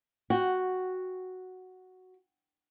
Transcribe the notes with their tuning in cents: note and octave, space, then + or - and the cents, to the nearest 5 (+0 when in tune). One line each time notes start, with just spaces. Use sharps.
F#4 +0 G5 +0